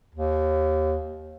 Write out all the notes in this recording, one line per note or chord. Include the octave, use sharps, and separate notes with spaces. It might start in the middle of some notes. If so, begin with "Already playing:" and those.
D#2